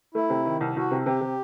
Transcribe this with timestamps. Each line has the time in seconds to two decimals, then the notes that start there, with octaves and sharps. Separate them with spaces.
0.14 A3 E4
0.30 C3
0.45 D#3
0.60 C2
0.76 C2 F#4
0.91 C3
1.06 C3 G4
1.21 C3